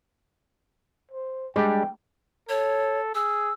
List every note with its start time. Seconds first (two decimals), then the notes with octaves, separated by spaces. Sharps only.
1.11 C5
1.56 G3 G#3 D4 G4 G5
2.49 A4 C#5
3.15 G#4 E6